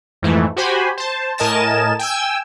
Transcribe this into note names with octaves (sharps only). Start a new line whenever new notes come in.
F2 G#2 E3 A3
F#4 G4 C5 G#5 B5
C5 A5
A2 A#4 D#5 G#5 A5 E7
G5 G#5 E6